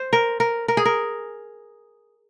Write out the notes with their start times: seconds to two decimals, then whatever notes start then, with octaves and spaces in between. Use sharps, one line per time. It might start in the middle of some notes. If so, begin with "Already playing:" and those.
Already playing: C5
0.13 A#4
0.40 A#4
0.68 A#4
0.77 G#4
0.85 A#4